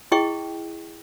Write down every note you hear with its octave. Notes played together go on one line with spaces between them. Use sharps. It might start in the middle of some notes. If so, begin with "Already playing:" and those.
E4 G#4 D#5 G5 C#6